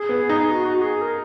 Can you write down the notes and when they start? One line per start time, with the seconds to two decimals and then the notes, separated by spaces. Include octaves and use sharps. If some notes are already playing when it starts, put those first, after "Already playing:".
Already playing: G#4
0.09 B3
0.29 D#4
0.50 F#4
0.81 G#4
1.01 A#4